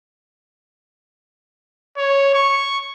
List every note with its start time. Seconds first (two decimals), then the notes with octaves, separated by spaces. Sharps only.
1.97 C#5
2.34 C#6